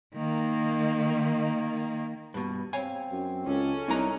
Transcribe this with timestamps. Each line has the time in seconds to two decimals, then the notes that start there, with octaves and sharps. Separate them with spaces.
0.16 D#3 A#3
2.34 G2 B2
2.73 C4 C#5 F5 G#5
3.11 F#2
3.46 C#2 C#4 A4
3.88 C2 C4 D4 D#4 A#5